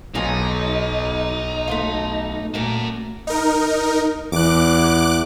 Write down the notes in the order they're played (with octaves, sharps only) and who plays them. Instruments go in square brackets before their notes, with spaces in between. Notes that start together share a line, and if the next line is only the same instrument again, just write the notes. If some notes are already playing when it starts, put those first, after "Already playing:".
[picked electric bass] B1 [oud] D#3 F4 G#4 [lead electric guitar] D#4
[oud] A3 B3 F4
[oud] A#2 A3 A#3 [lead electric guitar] F#4 A#4
[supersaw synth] D#4 A#4
[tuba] E2 [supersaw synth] D6 F#6